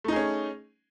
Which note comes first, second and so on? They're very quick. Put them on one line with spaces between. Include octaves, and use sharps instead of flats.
A3 D#4 G#4 C#4